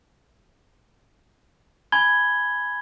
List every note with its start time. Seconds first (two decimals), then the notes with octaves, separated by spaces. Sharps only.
1.92 G#5 B5 G#6 G7